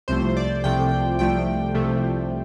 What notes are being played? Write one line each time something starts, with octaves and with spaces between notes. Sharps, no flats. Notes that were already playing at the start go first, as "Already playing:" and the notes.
C2 C3 F3 A3 C5
D5
C2 C3 F3 A3 G5
C2 C3 F3 A3 G5
C2 C3 F3 A3